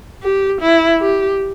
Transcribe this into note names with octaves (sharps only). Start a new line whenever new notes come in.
G4
E4
G4